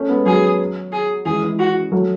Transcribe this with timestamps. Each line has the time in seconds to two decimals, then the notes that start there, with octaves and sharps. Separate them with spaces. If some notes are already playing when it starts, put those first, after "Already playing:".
Already playing: A3 C#4
0.09 G#3 B3
0.26 F#3 G#4
0.92 G#4
1.25 E3 G#3 G#4
1.42 E3 G#3
1.59 F#4
1.92 F#3 A3